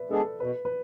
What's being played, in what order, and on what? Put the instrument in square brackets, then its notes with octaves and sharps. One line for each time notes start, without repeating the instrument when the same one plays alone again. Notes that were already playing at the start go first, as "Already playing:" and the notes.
Already playing: [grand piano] B4 D5 E5
[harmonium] G#3 B3 D4 G#4 [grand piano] A4
[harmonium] B2 [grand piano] B4
[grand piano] B4